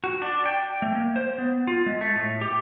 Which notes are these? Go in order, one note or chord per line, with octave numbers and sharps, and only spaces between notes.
F#4
D4
G5
A3
A#3
C5
B3
F4
G#3
A3
A2
G4